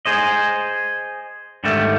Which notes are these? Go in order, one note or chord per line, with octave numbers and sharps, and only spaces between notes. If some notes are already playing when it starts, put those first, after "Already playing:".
G#4 C5 D#5
G#2 D3 D#3 G3 A3